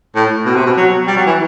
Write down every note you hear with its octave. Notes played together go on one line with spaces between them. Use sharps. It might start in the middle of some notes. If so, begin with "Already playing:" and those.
A2
B2
C3
B2
F#3
G3
F#3
E3